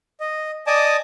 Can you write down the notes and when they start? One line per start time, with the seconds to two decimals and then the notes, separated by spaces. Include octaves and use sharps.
0.20 D#5
0.67 D5 D#5 G#5 A5 D6 D#6